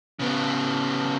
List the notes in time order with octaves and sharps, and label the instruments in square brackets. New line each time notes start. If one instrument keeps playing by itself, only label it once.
[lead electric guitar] C#3 B3